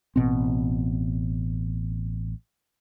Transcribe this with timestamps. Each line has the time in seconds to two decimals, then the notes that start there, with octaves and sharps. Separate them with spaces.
0.16 A1 B2 C4